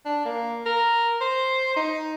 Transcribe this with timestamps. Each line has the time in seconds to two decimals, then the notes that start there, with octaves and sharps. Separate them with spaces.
0.05 D4
0.25 A#3
0.66 A#4
1.21 C5
1.76 D#4